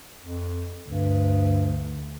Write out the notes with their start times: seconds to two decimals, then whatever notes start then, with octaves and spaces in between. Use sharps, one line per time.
0.21 F2
0.89 D2 G2